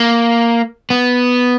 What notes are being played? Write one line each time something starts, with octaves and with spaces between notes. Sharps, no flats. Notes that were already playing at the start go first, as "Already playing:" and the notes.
Already playing: A#3
B3